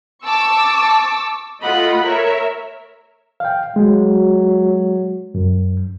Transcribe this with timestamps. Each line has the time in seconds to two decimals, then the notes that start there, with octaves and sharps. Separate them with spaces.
0.25 A5 C#6 D6 E6
1.62 A3 F4 D#5 F#5 B5
2.03 A#4 C#5 E5
3.40 F5 G5
3.76 F#3 G#3
5.35 F#2